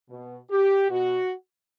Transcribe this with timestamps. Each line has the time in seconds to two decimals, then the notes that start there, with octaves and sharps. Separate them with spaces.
0.10 B2
0.50 G4
0.90 B2 F#4